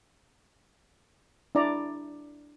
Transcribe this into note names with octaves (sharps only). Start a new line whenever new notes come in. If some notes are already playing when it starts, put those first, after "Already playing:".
D4 E4 D5 A#5